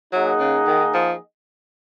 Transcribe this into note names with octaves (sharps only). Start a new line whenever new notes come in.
F#3 A#3 D#4 G#4 D#5 F#5
C#3
D#3
F3